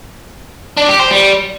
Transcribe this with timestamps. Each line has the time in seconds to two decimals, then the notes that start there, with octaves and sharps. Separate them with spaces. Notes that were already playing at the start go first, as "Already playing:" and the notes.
0.77 D4
0.88 G4
1.00 C5
1.11 G3